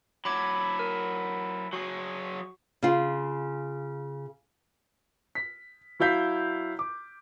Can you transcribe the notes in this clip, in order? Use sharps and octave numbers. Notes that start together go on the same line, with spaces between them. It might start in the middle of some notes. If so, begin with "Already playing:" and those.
F#3 E4 B5 D6 G#6
A#4
F#3 F#4 G#4 C#6
C#3 F4
B6
F#3 E4 F5 G6 B6
D6